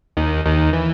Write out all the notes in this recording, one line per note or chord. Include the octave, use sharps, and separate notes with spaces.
D#2 D#3
D#2 D#3
E3